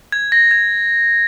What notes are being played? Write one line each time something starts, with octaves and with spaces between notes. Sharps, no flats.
G#6
A#6
G#6